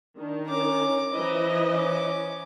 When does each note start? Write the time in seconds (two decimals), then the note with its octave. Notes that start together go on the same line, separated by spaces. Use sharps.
0.18 D#3 D4
0.47 C#4 A#5 D6
1.14 E3 E4 C5 D#5
1.72 C#4 D6